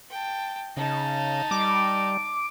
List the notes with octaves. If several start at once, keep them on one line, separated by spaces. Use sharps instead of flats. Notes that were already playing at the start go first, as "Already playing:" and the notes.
G5 A5
C#3 D#4 A5
G3 D6